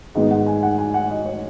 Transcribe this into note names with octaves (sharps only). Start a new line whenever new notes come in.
G#2 D#3 G#3 B3 D#4 D#5
F#5
G#5
F#5
G#5
F#5
D#5
C#5